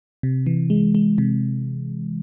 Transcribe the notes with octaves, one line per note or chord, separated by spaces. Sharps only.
C3
E3
G#3
G#3
C3